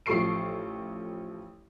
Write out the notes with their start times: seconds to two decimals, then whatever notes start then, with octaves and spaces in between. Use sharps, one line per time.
0.06 A1 F3 A4 C#6 C7 D7